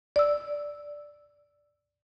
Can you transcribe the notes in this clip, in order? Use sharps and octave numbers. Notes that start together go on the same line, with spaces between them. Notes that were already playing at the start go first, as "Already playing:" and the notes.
D5 E6